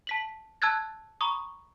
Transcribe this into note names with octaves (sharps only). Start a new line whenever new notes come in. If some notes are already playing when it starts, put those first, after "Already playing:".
A5 B6 F#7
A5 E6 F#6 G#6 A6
A#5 B5 C#6 D#6